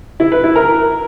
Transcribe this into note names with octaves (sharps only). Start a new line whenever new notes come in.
E4
B4
E4
A#4